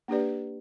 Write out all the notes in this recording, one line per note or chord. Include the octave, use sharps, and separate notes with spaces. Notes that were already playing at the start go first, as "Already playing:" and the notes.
A#3 D4 G4 B4 D5